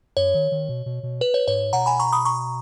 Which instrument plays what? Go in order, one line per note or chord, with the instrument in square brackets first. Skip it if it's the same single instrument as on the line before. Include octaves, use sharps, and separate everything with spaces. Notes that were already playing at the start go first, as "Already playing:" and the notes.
[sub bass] F#2 [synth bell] C#5
[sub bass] D#3
D#3
B2
B2
B2
[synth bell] B4
C#5
[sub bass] G#2 [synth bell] C#5
[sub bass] B2 [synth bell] F#5 A#5
[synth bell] G#5 B5
A#5 C#6
B5 D#6
A#5 C#6